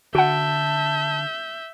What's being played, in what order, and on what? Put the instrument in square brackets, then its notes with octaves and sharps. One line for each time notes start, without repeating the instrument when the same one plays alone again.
[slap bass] D3 [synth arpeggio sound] F#4 F#5 [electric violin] E5 G6 [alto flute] A5